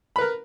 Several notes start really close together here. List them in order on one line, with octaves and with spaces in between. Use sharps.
B5 B4 A#4